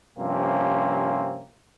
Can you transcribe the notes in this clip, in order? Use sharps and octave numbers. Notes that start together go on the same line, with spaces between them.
G2 C3 F3 A#3 C4 C#4